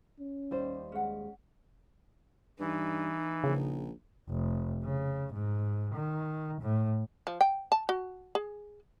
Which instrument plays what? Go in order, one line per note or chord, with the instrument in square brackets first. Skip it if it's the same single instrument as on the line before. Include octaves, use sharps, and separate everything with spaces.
[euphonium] C#4
[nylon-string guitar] D#2 G3 C5
[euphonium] G#3 [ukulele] C#4 F#5
[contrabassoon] G2 [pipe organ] E3 [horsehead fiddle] D#4
[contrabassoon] A#1 [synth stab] C#3
[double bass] F1
C#3
G#2
D#3
A2
[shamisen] F3
G5
A5
F#4
G#4